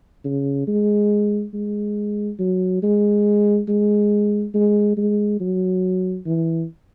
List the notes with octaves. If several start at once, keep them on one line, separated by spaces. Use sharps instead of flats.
C#3
G#3
G#3
F#3
G#3
G#3
G#3
G#3
F#3
E3